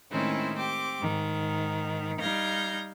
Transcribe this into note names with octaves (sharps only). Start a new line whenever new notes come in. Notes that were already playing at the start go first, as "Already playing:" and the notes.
A2 D#3 G#3 C4 C#4 E4
C4 G4 D6
G#2 D#3
G3 D#4 F5 G6 G#6 A#6